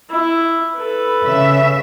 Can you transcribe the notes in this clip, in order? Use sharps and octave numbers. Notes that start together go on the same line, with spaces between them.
E4
A4 B4
C#3 E5